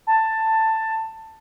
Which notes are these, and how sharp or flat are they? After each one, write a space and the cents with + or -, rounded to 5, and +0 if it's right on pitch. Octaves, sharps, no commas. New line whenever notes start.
A5 +10